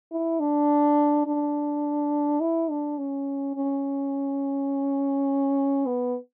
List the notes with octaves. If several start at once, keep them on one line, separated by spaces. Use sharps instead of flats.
E4
D4
D4
E4
D4
C#4
C#4
B3